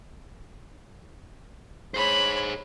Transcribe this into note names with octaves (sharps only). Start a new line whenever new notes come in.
G#4 C5 C#5 B5